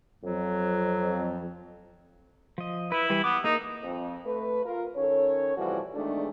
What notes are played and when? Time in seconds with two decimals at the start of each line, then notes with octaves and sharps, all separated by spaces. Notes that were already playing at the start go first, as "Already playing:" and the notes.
0.24 F2 F#3
2.58 F3 D#5
2.92 E4 B4
3.10 E3 G3 B4
3.24 B3 D6
3.44 A#3 D#4 G#4 A#4
3.83 F2
4.26 A3 B4
4.65 F4 A#4
4.96 D#3 C#4 A4 C#5
5.57 A2 C3 E3 F3 G3 F#4
5.94 E2 D#3 G#3 A3 D4